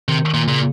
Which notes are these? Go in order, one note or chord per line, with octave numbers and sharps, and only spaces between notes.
C3 D#3
A#2
A#2 C#3